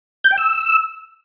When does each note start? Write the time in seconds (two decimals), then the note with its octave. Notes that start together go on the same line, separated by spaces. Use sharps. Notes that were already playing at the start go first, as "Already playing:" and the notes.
0.24 G6
0.31 G5
0.38 E6